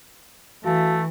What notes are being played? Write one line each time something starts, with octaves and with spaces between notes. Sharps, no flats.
E3 A3 F#4 F5 A5